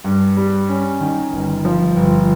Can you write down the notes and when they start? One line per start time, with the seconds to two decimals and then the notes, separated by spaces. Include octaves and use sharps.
0.04 G2
0.37 G3
0.69 C#4
1.01 D#3
1.33 G1
1.65 F3
1.96 G1